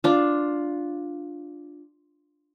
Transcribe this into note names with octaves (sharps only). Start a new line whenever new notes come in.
D4 F4